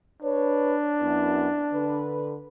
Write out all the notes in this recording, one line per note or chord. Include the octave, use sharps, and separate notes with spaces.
D4 B4 C#5
F#2 B3 E4
D3 B4